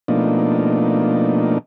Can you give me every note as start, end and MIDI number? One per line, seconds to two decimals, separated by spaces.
0.08 1.58 47
0.08 1.58 53
0.08 1.58 57
0.08 1.58 58
0.08 1.58 62
0.08 1.58 63